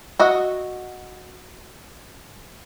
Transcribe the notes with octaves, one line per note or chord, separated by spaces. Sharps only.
F#4 D#5 E5 F#5